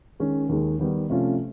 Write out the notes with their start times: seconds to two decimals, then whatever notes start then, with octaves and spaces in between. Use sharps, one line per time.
0.20 D#3 G#3 C#4
0.49 D#2 D#3 G#3
0.79 D#3 G3 B3
1.09 C3 F3 A3 C#4 F4